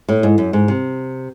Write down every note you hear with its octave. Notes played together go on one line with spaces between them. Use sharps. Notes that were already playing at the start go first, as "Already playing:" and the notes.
A2
G#2
F#2
G#2
C3